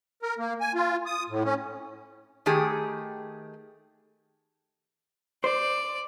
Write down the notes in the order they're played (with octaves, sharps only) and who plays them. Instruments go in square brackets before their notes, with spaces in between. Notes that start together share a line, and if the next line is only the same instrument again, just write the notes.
[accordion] A#4
A#3
G#5
F4
D#6
A2
C#4
[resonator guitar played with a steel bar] D#3 A3 G4 G#4
[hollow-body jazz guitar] C5 [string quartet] D5